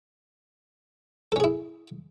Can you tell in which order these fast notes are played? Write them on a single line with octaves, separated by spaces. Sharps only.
A4 C#4 G#4 E4